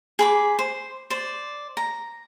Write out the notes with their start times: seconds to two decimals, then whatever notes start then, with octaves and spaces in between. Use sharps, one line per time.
0.19 G#4 B5 D6
0.59 C5
1.10 C5 D5
1.77 A#5